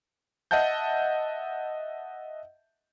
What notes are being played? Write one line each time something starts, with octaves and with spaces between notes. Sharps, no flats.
D#5 E5 F#5 A5 G6